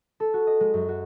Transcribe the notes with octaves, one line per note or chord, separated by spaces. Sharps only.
A4
F#4
D#5
G#3
F#2
F#4